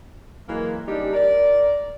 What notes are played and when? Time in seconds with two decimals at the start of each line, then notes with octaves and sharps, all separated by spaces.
0.48 E3 F#3 G#3 A#3
0.88 C#3 G3 D4 D#4 G4
1.13 A#4 D5